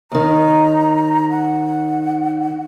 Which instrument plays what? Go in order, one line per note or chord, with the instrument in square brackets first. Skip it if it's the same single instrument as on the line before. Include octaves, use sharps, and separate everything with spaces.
[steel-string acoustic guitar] D#2 D#3 [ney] A#5
[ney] F#5